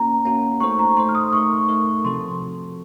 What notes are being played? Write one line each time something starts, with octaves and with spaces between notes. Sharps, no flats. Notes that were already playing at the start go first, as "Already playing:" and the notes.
Already playing: A#3 C#4 F#4 A#5
A#3 C#4 F#4
A3 D#4 A4 C5 C#6
A#5
A3 D#4 A4 C5 C6
F6
D#6
A3 D#4 A#4 C#6
A3 D#4 A#4
C3 F3 C4 F#4 A4 C6